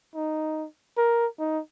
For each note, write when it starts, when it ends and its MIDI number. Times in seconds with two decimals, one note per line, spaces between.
0.15 0.67 63
0.97 1.27 70
1.39 1.60 63